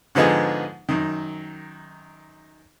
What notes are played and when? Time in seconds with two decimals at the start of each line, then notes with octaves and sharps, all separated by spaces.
0.15 G#2 D3 F3 B3 D#4 G#4
0.89 F#2 D#3